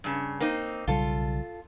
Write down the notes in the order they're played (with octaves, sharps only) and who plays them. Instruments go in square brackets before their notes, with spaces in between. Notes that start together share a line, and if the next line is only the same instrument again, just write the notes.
[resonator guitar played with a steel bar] G2 C#3
A#3 C4 D#4
[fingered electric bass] B1 C#3 G3 [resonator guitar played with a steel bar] F4 A4